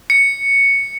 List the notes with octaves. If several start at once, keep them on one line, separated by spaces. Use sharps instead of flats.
C#7